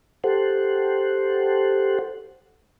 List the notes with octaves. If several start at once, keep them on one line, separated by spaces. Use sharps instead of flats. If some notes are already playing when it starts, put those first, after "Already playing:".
G4 A4 C5 F#5